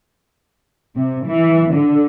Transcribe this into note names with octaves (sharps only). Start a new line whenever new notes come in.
C3
E3
D3